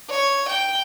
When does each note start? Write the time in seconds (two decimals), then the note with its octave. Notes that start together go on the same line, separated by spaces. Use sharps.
0.10 C#5
0.49 G5